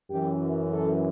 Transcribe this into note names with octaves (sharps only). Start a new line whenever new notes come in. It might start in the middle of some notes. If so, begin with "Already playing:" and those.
F#2 E3 G4
A4